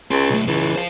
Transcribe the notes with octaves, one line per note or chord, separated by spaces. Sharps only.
C#2 C#4 C6
B1 A3
C#2 C#3 E3
C5 F5